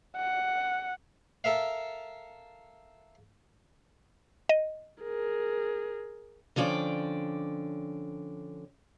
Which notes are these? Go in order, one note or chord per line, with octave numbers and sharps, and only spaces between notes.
F#5
A4 A#4 E5 F5
D#5
G#4 A#4
D3 F3 C#4 D5 G5